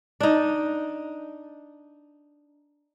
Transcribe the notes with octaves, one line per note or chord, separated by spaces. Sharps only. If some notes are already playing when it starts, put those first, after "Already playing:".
D4 D#4